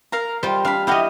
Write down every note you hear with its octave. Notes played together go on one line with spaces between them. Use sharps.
A#4 F5 A#5
G3 F4 C5
D4 F5 B5
E4 F#4 G4 D#5 F5